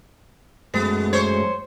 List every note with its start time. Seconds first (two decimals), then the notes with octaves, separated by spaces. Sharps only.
0.74 F#2 G#3 A3 B3
1.13 C5 C#5